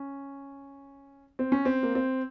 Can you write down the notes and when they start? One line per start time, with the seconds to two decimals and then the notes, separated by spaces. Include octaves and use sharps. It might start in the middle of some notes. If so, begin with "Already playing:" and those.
Already playing: C#4
1.39 C4
1.52 C#4
1.65 C4
1.83 A#3
1.95 C4